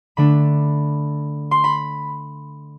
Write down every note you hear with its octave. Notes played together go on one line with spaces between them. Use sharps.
D3 A3 D4 B5
C6
B5